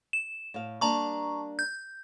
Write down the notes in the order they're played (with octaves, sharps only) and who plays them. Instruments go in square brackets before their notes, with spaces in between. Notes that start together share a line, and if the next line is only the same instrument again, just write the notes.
[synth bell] E7
[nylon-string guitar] A2 F5
[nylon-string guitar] G3 A#3 D4 [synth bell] A5 A#5 C#6
[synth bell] G6